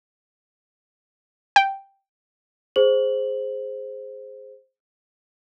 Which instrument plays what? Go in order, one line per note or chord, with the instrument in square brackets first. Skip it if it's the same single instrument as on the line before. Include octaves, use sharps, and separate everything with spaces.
[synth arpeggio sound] G5
[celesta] G#4 C5 F#7